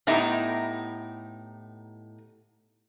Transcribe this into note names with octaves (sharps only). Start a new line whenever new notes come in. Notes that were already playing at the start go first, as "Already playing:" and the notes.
A2 B3 D#4 G4 E5 A#5